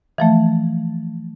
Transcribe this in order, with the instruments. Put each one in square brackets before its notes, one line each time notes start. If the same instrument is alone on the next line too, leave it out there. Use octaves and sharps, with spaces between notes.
[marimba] E3 F3 A3